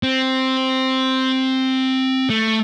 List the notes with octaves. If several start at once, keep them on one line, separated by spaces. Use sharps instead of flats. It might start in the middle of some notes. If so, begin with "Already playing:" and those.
C4
A3